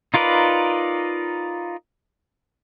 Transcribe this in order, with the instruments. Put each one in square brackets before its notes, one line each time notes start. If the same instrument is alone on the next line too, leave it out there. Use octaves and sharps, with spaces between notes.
[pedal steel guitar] D#4 F4 A#4 B4 D5